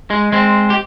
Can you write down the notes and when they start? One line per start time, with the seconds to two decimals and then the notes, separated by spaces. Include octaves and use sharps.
0.10 G#3
0.32 G#3 C4
0.70 G4